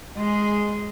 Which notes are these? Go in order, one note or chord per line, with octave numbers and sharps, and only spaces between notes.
G#3 G#4